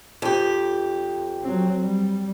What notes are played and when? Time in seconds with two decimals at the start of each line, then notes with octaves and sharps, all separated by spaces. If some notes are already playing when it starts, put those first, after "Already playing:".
0.22 F2 G4
1.43 F#3 C4
1.82 G3